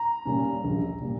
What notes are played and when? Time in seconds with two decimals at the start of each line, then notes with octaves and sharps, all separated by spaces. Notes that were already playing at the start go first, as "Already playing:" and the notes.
Already playing: A#5
0.25 A#2 G3 C#4
0.64 A#1
1.01 A#2 G3